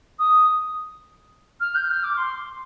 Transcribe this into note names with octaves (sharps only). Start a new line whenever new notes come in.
D#6
F6
G6
F6
D6
C6